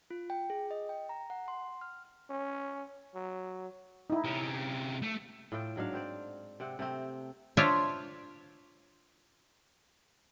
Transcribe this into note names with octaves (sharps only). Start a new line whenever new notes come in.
F4
G5
G#4
D#5
G5
A#5
F#5
C6
F6
C#4
F#3
D#4 E4
C3 C#4
A3
A2 F4 A4 G5
G#2 F#3 D4 F5
C4 C5 D5
C3 C4 F#5
C3 A3 C4
D4 F4 C5 C#5 E5 F5